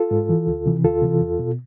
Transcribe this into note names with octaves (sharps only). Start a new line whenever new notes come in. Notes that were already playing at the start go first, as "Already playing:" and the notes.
Already playing: F4 A4
G#2
E3
D2
C3 E3
D2 F4 A4
C3 E3
E2
B2